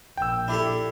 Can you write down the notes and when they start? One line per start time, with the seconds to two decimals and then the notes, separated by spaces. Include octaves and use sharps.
0.17 A#1 G5 E6
0.48 D4 E4 G4 A4